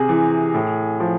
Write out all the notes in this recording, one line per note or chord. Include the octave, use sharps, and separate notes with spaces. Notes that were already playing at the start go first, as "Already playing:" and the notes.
Already playing: C3 G#4
E3
A2
F3